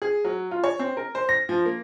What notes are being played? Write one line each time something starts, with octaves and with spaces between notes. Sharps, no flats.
G#4
F#3
F4
C#5
C4
A#4
C5
A#6
F3
A#3